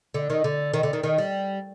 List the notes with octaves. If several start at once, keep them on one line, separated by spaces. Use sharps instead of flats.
D3
D#3
D3
D#3
D3
D#3
D#3
G3